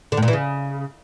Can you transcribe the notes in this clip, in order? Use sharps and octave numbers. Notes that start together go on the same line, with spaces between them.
D3
A2
A#2
E3
C#3